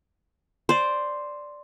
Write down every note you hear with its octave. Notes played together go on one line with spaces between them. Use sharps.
C5 D5